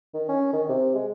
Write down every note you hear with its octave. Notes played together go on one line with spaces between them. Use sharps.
D#3
C#4
D#3
C3
G#3